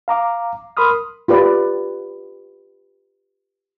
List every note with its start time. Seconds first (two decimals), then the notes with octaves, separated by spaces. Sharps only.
0.08 F5 A#5 D6
0.77 A#4 B5 C6 D#6 F6
1.28 F4 G4 B4 D5